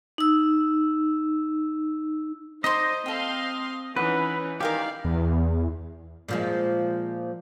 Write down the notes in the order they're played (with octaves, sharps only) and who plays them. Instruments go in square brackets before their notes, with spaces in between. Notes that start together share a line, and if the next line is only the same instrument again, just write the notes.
[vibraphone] D#4 E6
[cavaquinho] D#4 D5 C6 [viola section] C5 [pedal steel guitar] D#5
[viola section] C4 F5 C6 [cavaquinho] A4 G5
[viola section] E3 C#4 D#4 [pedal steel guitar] B4 [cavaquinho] F#5
[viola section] D#3 D5 F5 [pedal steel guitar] G4 [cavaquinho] A#4 G5 G#5
[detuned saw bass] E2
[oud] A#2 F3 G#3